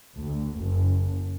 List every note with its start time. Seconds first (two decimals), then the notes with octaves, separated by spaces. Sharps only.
0.16 D2
0.58 F#1